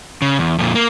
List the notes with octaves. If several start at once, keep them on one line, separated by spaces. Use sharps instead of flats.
C#3
E2
F2 A#2
A#3